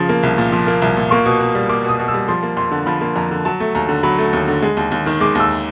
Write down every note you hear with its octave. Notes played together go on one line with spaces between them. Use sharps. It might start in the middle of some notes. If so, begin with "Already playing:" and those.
Already playing: C#3 F3
A#3
C2
A#2
F3
A#3
C2
A#2
A#3 C#6
B2
B2
G3
A#3 D6
B2 D#6
B2
E6
G3
F3 C6
A#3
F2 C6
D3
F3 B5
A#3
F2 A#5
D3
F#3 A5
A3
D#2 A#5
D3
F#3 B5
A3
D#2
D3
G#3
D#2
D#2
D#3
G#3 D6
D#2 E6